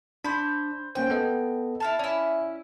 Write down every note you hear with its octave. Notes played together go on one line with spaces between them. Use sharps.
D4 C5 B5
A#3 C#4 C5 G5
B3 A4 D#5
E4 F5 A5
C#4 E4 D5